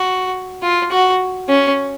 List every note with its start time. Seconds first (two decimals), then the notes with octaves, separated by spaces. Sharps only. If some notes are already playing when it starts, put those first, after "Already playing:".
Already playing: F#4
0.63 F4
0.92 F#4
1.49 C#4